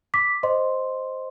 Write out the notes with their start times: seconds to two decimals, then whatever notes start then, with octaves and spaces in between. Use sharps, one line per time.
0.14 D6 B6
0.43 C5 D#5 C6